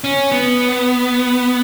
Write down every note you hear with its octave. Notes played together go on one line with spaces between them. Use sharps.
C#4
B3